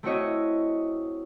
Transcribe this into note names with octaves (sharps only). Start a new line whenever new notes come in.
A3 C4 E4 F#4 C#5 D#5